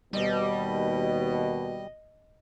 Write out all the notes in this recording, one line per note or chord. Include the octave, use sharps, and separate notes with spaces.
D#2 B2 G3 D#5